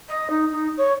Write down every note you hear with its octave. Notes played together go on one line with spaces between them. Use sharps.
D#5
D#4
D#4
C#5